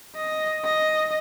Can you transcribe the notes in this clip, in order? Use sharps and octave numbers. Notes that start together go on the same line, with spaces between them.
D#5
D#5